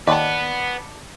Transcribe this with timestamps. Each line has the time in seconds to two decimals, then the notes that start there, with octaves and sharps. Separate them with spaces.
0.07 D#2 B4 D5 F#5 A5